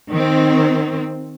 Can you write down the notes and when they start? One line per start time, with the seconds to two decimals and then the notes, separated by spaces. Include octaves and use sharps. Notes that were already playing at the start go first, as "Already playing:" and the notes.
0.10 D#3 C4